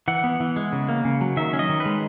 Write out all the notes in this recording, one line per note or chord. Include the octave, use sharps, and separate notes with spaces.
E3 F#5
B3
E3
G#3
C#3
A#3
C#3
F#3
D#3 E5
C#4
D#5
D#3
B4
G#3